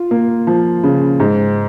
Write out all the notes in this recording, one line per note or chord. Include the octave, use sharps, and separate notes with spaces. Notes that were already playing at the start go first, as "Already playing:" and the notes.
Already playing: F4
A#3
F3
C#3
G#2